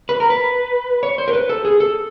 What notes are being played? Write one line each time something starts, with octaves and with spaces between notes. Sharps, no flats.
B4
A#4
B4
C#5
C5
A#4
B4
A4
G#4
A4